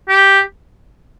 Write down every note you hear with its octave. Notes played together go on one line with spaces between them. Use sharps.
G4